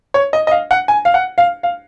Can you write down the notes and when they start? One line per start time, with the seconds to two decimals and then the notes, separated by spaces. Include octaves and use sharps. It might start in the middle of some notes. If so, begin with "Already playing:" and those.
0.14 C#5
0.33 D#5
0.47 D#5
0.51 F5
0.71 F#5
0.88 G#5
1.05 F5
1.14 F#5
1.38 F5
1.63 F5